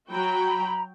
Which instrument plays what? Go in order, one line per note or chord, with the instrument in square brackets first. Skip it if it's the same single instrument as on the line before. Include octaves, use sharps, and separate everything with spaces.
[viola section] F#3 F#4 G5 [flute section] A#5 B5